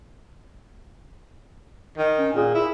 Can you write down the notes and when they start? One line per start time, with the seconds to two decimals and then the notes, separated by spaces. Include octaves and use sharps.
1.98 D#3
2.18 C#4
2.35 A#2 G#4
2.55 E4